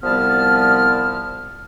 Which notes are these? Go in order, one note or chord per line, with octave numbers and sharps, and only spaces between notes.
C2 F3 G3 B3 A5 F6